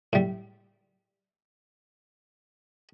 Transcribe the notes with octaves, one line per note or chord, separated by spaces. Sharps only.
A2 G3